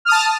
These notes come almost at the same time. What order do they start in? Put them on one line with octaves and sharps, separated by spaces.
F6 D#6 A5